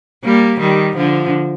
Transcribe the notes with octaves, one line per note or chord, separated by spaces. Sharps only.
G3 A#3
D#3 G3
D3 F3